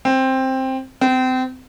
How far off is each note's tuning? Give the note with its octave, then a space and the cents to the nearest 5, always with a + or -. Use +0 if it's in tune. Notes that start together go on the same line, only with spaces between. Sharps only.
C4 +10
C4 -30